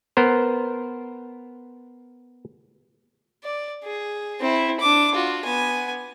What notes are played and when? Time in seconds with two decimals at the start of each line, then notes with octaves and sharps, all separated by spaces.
0.17 B3 A#4 C5
3.44 D5
3.85 G#4
4.40 C4 E4
4.80 D4 D6
5.15 F4 F#4
5.45 B3 G#5